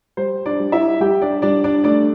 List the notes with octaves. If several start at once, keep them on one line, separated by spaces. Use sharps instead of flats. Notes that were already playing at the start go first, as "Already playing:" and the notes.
G3 C5
D4 D5
G3
E4 E5
G3 G4 G5
D4 D5
G3 D4 D5
D4 D5
A3 D4 D5